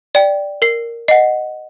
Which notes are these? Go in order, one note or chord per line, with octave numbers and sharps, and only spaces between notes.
D5 G5
A#4 C7
D#5 F#5 C7